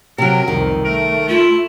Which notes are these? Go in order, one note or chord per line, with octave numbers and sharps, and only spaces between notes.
C3 F#3 A#4
C2 F2 D#3
A3 A#4
E4 F4